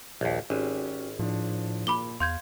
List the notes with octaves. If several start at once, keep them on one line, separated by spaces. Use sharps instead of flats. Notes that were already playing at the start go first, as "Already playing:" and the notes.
A#1 D#2
G#1 C#4 F#4 G4
A2 F3 D4
A#2 B5 D6 G7
E2 F5 C6 G6 G#6